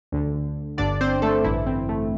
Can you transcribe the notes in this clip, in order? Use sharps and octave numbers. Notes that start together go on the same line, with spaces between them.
D2 D3
G1 G2 D3 D4 D5
C4 C5
A3 A4
A1 G2 D3 E3 E4
C4
A3